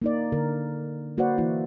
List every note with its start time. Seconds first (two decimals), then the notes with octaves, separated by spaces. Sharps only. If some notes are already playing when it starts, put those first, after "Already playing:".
0.02 A#3 D#4 D5
0.32 D3 A#4
1.17 A#3 F#4 B4 C5 D5 F#5
1.38 E3 A#3 E4